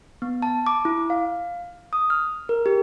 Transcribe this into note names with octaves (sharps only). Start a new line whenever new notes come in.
B3
A5
D6
E4
F5
D#6
F6
A#4
G4